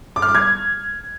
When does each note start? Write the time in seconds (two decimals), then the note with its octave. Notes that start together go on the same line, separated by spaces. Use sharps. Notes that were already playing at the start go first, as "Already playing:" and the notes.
0.16 D6
0.22 F6
0.28 D6
0.35 G#6